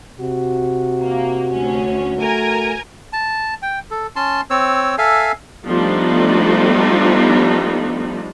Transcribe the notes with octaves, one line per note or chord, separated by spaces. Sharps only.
C3 F#4
A#3
D2 C#4
A3 A#4 G#5
A5
G5
A4
C#4 A5 C6
C4 C#5 E6
A4 E5 F5 G#5
F3 G3 A3 B3 D4 D#4